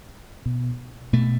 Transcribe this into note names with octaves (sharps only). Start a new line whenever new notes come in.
B2
B2 A3